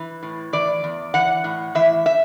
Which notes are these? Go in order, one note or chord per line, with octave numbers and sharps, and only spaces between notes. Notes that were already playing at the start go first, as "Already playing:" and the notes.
Already playing: E3
A2
E3 D5
E2
E3 F#5
A2
E3 E5
E5